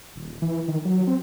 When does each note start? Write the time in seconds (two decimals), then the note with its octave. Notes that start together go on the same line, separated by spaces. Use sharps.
0.15 D#1
0.42 E3
0.68 D#3
0.85 F#3
1.07 C4